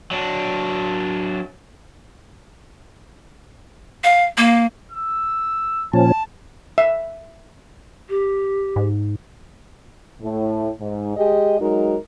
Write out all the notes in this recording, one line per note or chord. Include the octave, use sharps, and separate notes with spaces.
F#3 D4
F5
A#3
E6
A#2 F3 C#4 A5
E5
G4
G#2
A2
G#2
G#3 G4 G#4 D#5
F#3 G#3 D#4 F#4 A#4